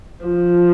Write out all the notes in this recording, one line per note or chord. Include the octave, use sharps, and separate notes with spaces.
F3